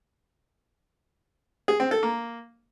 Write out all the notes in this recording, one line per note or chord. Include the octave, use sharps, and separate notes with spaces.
G#4
C4
A4
A#3